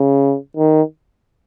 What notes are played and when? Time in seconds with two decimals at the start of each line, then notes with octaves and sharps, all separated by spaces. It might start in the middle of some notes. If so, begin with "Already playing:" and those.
Already playing: C#3
0.57 D#3